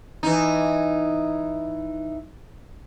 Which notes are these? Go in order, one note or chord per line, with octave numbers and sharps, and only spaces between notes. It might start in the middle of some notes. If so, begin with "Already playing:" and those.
E3 D#4